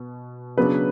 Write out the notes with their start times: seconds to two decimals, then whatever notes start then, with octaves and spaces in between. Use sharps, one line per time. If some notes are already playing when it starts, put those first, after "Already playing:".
Already playing: B2
0.57 C#3 F#3 B3 D4 B4